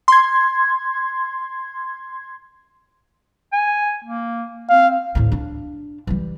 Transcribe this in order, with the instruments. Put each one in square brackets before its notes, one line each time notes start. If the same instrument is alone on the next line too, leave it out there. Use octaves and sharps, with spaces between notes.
[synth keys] C6 G#6
[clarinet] G#5
A#3
[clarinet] C4 [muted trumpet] F5
[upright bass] D2 A2
D4
E3 G3